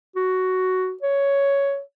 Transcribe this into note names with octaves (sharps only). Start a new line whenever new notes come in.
F#4
C#5